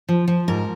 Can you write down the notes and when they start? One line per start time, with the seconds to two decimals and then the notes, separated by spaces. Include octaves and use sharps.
0.09 F3
0.28 F3
0.48 G#2 A#4